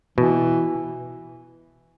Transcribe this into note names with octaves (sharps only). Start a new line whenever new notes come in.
B2 E3